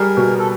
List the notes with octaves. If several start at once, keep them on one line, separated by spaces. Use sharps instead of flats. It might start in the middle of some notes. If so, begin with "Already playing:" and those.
Already playing: G3 G#4 A#4
B2
A4